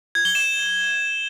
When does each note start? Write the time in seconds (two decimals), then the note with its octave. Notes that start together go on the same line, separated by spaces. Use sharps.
0.15 G#6
0.25 G7
0.35 E7